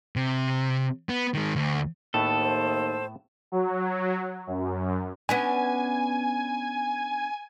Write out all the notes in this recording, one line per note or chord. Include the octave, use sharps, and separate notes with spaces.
C3
B3
D#3 G#3
D2
D#2 A2 A3 B3 A4
C5
F#3
F#2
B3 C#4 D4 G#5